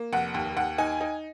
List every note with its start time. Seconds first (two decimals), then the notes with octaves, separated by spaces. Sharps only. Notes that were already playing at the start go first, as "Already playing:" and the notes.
Already playing: A#3
0.13 F1 F#5
0.34 D#2
0.57 D#2 F#5
0.78 D#4 G#5
1.01 D#4